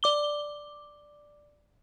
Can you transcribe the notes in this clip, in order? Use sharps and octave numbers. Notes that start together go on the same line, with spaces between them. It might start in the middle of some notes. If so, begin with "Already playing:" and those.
D5 D6 G7